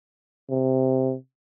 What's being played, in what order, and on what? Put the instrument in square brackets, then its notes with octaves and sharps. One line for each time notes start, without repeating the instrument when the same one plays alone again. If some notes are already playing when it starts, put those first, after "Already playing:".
[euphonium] C3